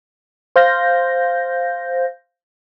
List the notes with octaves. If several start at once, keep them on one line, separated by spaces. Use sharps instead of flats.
C5 F5 G6 A#6